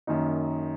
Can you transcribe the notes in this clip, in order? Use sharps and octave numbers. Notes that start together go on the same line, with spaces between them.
F#2 D#3 A#3 D#4